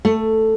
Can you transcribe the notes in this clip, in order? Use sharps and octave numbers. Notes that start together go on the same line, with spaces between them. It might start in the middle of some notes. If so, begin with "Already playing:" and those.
A3